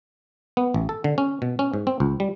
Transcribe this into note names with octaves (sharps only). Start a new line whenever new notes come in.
B3
A1
A4
D3
C#4
B2
C#4
G#2
C4
C#2
G3